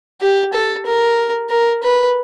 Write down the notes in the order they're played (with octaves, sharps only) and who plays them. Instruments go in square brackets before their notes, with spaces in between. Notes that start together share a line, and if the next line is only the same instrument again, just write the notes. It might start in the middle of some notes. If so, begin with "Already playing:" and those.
[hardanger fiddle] G4
A4
A#4
A#4
B4